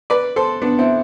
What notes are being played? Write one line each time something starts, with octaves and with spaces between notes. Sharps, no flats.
B4 D5
A4 C5
B3 D4
C4 E4